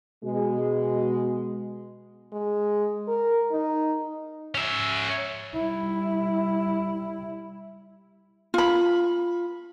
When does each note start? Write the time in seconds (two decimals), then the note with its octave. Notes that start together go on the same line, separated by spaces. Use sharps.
0.24 B2 G#3
2.32 G#3
3.08 A#4
3.52 D#4
4.55 C#4 E5
5.55 G3 E4
8.54 F4 B5